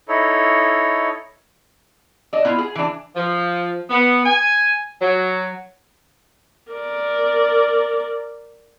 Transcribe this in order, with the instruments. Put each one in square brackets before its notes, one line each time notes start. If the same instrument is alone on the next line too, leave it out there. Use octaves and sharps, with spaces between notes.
[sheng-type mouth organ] D#4 E4 A4 C#5
[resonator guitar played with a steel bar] D4 D#5
B3 E4 F4
G#4
E3 D4
[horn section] F3
B3
G#5
F#3
[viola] A#4 D5